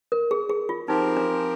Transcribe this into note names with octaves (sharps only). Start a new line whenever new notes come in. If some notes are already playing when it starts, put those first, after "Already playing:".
A#4
G#4
G#4
F4
F3 C4 D#4 G4 A#4
D4